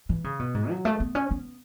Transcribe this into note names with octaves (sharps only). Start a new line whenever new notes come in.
E3
C#3
B2
G#2
F#3
A3
B3
C#4
B3